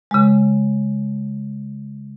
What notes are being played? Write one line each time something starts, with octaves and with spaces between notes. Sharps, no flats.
C#3 G#3